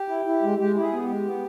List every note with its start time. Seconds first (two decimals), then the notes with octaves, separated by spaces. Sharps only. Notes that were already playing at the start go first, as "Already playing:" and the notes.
Already playing: G4
0.08 E4
0.26 E4
0.42 G#3
0.58 G#3 G4
0.75 E4 G4
0.80 G#4
0.92 B3
1.02 G4
1.08 G#3
1.25 B3